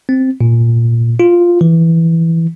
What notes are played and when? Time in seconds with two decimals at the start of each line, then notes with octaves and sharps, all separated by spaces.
0.09 C4
0.41 A#2
1.20 F4
1.61 E3